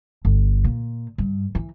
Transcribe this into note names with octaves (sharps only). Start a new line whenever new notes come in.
G1
A#2
G2
E3